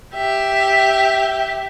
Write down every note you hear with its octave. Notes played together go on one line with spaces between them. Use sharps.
G4 E5